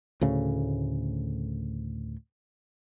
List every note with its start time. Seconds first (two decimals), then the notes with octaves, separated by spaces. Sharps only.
0.21 D2 A2 C#3